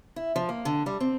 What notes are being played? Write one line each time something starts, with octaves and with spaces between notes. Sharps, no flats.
E4
F3
A#3
D3
G3
C4